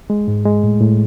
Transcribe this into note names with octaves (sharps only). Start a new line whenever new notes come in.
G#3
G#2
G#3
A2
A2